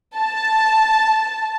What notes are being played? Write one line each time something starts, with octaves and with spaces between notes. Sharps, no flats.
A5